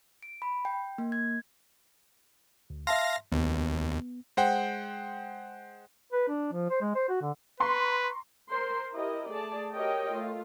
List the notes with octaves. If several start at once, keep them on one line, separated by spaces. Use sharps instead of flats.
D7
B5
G5
A#3
G#6
D2
E5 F5 A5 C6 A#6
D#2 B3
G#3 C5 F#5 G5
B4
D4
F3
C5
G#3
C5
F#4
D3
B4 A#5 C6 C#6
A#4 C5 C6
E4 G4 A#4 D#5
A3 G#4 D5 A5
F#4 G4 A#4 C#5 D#5 G5
A3 F4